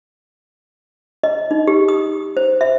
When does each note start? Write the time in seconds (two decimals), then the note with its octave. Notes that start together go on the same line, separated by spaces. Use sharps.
1.24 D#5
1.51 D#4
1.67 G4
1.88 D#6
2.37 C5
2.61 E5